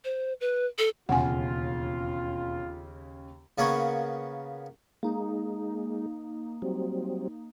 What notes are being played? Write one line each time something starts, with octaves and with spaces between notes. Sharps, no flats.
C5
B4
A4
E1 D#2 C#3 F4 F#5 G#5
C#3 A#3 B3 C#5
G#3 A#3 D#4
F#3 G3 C4